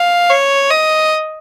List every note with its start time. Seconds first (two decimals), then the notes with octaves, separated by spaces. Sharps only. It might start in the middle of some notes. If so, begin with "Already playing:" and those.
Already playing: F5
0.30 C#5
0.70 D#5